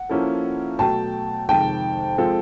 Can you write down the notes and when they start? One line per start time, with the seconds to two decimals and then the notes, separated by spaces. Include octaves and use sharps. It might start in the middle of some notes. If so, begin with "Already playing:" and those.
Already playing: F#5
0.09 F3 A#3 C#4 E4 A4
0.79 B2 F#3 A3 G5 A5
1.49 F2 C3 D#3 G#3 G5 A5
2.18 F3 G#3 C4 F4 A4